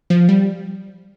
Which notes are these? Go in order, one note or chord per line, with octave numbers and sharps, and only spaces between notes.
F3
G3